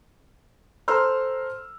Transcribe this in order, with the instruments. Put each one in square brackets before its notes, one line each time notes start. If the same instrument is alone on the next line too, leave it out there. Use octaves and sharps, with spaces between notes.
[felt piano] A4 C5 A#5 C6 E6 F6